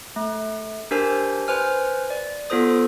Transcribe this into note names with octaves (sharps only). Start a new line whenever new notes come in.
A3
D4 G4 A#4 C5 G#5
B4 C5 G#5 F6
D5
B3 F4 A4 C5 D#6